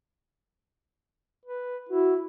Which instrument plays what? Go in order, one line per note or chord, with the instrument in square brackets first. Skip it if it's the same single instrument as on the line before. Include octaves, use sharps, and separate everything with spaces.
[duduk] B4
[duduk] E4 [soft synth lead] F#4